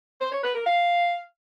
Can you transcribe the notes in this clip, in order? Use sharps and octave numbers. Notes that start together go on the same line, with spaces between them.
C5
C#5
B4
A#4
F5